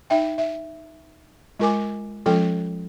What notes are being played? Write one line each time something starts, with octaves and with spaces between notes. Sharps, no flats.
D#4 E5 G5
E5
G#3 F4 A#4 G#5 D6
F3 G#3 C#4 F4 A4 G5